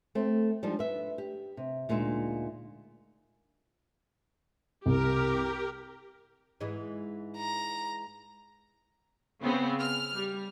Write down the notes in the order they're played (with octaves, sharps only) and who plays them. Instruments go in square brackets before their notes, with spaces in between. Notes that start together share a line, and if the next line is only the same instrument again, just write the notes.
[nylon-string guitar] A3 C4
F3 G3 G#3 D4 D#4
B4 E5
G4
C3
D2 A#2 G#3 D#4 D#5 E5
[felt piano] C2 [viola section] G4 A#4
[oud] G#2 E3 G#3
[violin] A#5
[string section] C#3 B3 C4
F6
G3